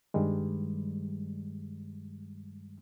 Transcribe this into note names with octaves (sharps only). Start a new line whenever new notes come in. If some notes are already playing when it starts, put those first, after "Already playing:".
G2 D#3 G3 G#3